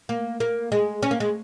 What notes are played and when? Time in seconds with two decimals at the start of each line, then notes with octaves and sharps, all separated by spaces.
0.09 A#3
0.40 A#3
0.72 G#3
1.03 C#4
1.11 A#3
1.20 G#3